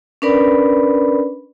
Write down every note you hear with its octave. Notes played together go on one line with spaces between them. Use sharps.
C#4 D4 A#4 B4 D5 B5